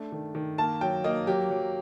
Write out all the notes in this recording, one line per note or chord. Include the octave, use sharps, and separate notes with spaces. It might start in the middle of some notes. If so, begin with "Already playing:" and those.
Already playing: A3 D4
D#3
D#3
A#3 A5
F#3 G5
A#3 D#5
F#3 G4
F#3